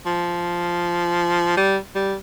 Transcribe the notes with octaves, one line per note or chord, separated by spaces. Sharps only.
F3
G3
G3